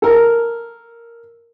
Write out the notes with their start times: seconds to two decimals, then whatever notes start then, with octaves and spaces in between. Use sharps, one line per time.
0.02 A4 A#4